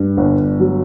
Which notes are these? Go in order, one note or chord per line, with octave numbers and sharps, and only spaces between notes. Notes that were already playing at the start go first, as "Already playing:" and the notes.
Already playing: G2
G1
F#3